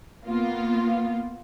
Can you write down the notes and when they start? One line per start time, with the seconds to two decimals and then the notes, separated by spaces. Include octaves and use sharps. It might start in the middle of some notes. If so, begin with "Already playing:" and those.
0.25 A#3 B3 F4